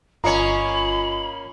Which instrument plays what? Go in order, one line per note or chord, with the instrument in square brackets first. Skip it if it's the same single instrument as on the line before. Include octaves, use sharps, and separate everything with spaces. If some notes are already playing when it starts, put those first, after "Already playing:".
[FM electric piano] G1 F4 D#5 [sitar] A#3 C#4 [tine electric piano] A#5 C#7 [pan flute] B5